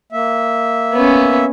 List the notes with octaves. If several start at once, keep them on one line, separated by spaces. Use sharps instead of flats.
A#3 E5
B3 C#4